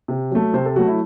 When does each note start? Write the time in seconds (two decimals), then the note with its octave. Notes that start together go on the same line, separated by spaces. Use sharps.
0.08 C3
0.31 F#3 A3
0.54 C3 C5
0.65 A4
0.76 F#3 A3 F#4
0.88 E4